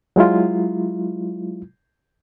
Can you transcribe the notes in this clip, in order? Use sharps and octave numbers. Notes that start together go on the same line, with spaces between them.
F#3 G#3 E4 F4